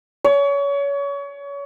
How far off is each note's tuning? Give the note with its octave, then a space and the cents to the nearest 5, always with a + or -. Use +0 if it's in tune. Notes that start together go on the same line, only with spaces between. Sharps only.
C#5 +30